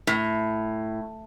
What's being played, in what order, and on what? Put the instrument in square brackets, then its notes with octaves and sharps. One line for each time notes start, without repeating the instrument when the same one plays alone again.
[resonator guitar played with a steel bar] A2